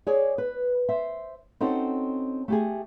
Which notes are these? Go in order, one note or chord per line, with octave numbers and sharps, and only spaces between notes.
G#4 C#5 D5
B4
C5 E5
C4 C#4 D#4 F#4 A4 C5
A3 G4 G#4